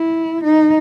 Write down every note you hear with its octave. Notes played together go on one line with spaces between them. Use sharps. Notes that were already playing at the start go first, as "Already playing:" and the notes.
Already playing: E4
D#4